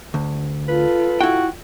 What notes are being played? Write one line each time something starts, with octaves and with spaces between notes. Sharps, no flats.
D2
F4 A4 B4
E4 F#4 G5